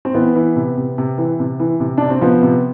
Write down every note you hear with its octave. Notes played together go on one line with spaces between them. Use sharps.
C4
E3 B3
E3
C3
C3
C3
E3
C3
E3
C3
C3 D4
C4
F3 B3
C3